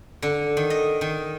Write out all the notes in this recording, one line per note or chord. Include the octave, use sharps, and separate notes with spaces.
D3
D#3
D#5
D#3